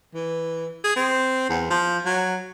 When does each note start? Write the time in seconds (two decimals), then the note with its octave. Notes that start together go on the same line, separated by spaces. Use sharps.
0.15 E3
0.84 G#4
0.96 C4
1.49 E2
1.70 F3
2.05 F#3